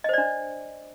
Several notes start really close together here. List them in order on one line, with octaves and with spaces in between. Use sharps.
D#5 C5 D5 D4